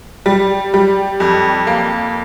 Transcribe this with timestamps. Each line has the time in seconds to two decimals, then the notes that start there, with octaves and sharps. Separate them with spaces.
0.26 G3
0.74 G3
1.20 F2
1.67 A#3